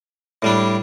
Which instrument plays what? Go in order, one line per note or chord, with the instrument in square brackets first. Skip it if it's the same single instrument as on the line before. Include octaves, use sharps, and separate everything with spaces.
[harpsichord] A2 G3 D4